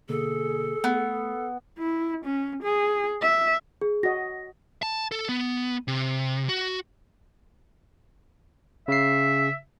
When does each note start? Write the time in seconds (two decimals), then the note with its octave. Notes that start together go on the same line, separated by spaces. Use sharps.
0.09 B2 D3 A#3 G#4 A4
0.84 A3 B3
1.79 E4
2.25 C#4
2.63 G#4
3.22 E5
3.81 G#4
4.03 F#4 D#5 A#6
4.83 A5
5.12 A4
5.29 B3
5.88 C3
6.49 F#4
8.88 C#3 E5 C7